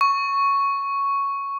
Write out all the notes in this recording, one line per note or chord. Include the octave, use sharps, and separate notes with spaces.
C#6